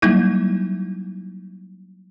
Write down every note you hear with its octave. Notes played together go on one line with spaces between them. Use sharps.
F#3 G3 A#3 D#4 E4